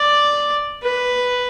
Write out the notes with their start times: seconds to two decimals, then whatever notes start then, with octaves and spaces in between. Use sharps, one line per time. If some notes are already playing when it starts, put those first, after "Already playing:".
Already playing: D5
0.83 B4